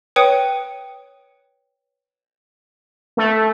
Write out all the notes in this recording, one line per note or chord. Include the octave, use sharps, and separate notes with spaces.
B4 C#5 G5 D#6 C#7 D#7
A3